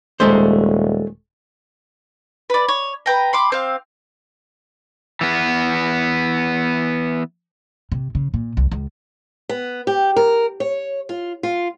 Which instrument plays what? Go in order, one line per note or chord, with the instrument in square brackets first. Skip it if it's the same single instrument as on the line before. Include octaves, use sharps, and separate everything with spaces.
[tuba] D#1 [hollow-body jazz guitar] G#3 A3 C5
[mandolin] B4 D5
C#5
B4 G5 A#5
B5 C6 D6
C4 F5
[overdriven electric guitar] E3 B3
[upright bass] C3
C#3
A#2
C2
C#2
[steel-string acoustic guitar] B3
G4
A#4
C#5
F4
F4